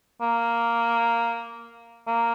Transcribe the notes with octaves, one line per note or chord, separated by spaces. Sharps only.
A#3
A#3